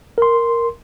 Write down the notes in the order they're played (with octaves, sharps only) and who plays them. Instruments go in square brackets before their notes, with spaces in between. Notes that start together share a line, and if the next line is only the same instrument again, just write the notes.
[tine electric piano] A#4 C6